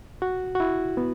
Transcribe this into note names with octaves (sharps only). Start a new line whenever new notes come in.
F#4
F#4
E4
B3